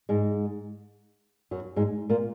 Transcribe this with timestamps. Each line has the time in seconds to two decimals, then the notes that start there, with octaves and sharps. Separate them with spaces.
0.09 G#2 G#3
1.51 F#2 F#3
1.76 G#2 G#3
2.09 A#2 A#3